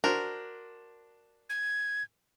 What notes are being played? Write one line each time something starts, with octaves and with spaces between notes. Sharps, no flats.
D4 F#4 A#4 C5
G#6